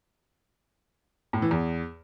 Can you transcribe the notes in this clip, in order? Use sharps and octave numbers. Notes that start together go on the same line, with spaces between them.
A2
E3
E2